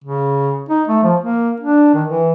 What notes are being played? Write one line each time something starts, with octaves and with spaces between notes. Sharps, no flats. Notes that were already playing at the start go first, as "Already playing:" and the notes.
C#3
D#4
A3
F3
A#3
D4
D#3
E3